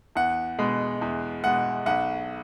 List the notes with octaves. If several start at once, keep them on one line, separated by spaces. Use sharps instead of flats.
E2 F#5
B2 G#3
E2
B2 G#3 F#5
B1 F#5